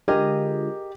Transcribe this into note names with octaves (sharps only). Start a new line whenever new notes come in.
D3 G#3 F4 G4 G#4 A#4 D#5